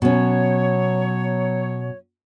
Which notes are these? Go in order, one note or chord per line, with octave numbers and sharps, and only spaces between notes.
B2 F#3 C#4 C#5